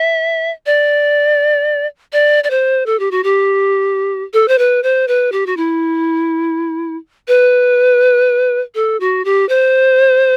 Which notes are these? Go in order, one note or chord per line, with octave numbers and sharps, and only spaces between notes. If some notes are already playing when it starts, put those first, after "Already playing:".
Already playing: E5
D5
D5
D5
C5
A4
G4
F#4
G4
A4
C5
B4
C5
B4
G4
F#4
E4
B4
A4
F#4
G4
C5